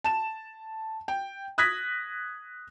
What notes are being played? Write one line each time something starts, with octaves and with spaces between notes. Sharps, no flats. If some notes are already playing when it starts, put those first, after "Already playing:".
A5 E7
G5
D#6 F#6 G#6 A#6 B6